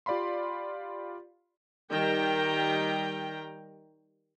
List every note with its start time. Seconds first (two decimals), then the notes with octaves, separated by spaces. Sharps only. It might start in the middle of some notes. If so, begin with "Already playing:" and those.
0.06 F4 G4 D5 F5 B5 C6
1.90 D#3 G3 G5 A#5